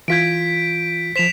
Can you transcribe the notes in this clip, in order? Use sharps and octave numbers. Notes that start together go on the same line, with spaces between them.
E3 F4 G6 G#6 B6 D7
F3 C5 B6 E7 F7